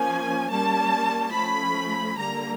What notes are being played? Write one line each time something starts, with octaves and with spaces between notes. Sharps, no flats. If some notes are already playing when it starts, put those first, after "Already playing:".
Already playing: F3 A#3 C#4 G#5
G3 A#3 C#4 A5
F3 A3 C#4 B5
D3 G3 A#3 A#5